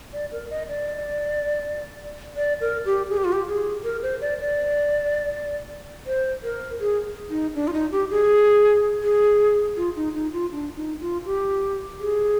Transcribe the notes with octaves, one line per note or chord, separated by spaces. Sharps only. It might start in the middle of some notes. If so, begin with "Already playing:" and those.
D5
A#4
D#5
D5
D5
A#4
G4
G#4
G4
F4
G4
G#4
A#4
C5
D5
D5
C5
A#4
G#4
D#4
D4
F4
D#4
G4
G#4
G#4
F4
D#4
D#4
F4
D4
D#4
F4
G4
G#4